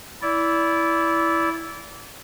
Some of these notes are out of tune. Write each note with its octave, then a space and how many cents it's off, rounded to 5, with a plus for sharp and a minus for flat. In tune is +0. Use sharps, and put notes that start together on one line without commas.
E4 +0 D5 -25